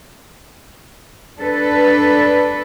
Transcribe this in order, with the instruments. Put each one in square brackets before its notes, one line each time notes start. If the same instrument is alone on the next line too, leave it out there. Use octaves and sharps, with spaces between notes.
[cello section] D4 A4 B4